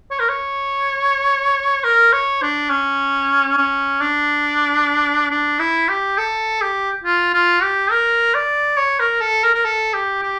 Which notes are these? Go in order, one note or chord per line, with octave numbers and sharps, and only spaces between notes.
C#5
A#4
C#5
A#4
C#5
D4
C#4
C#4
D4
D4
E4
G4
A4
G4
F4
F4
G4
A#4
D5
C#5
A#4
A4
A#4
A#4
A4
G4
G4